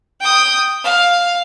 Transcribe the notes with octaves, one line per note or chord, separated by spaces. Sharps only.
G5 D#6
F5